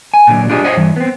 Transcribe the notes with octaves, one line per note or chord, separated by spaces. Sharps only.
G#5
A#2 D3 F#3
D4 F4 G4 G#4 D#5
C5 C#5 D#5 F#5
G2 E3
B3 C4